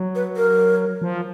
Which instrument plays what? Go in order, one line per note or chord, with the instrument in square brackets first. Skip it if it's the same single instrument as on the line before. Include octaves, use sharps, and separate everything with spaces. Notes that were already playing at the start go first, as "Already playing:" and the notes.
Already playing: [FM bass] F#3
[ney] B4
A#4
[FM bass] F3